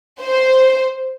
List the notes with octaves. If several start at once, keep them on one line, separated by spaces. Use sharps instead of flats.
C5